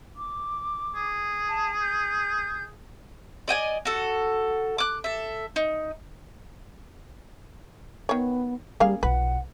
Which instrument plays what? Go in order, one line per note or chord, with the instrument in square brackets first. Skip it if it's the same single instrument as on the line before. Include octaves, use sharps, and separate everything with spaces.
[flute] D6
[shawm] G#4
[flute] A5
G6
[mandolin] D5 D#5 G5 G#5
F#4 A4
D6 F#6
A4 E5
D#4
[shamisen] D#3 C#5 [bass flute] B3
[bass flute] G3 [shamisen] A#3 G#4 F5 [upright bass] C#4
[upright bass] B1 F4 [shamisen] B4 [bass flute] F#5